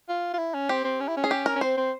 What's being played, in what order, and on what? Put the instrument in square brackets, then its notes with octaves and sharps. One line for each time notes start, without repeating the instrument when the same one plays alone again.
[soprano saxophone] F4
F4
E4
C#4
[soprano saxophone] C4 [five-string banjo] G4
[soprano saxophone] C4
C#4
E4
C#4
[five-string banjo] G#4
G4
A#4
[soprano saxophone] C#4
[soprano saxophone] C4 [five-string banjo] C5
[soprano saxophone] C4